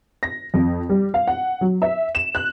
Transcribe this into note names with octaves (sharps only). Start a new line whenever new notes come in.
A#6
F2
G3
F5
F#5
F#3
E5
E7
F#6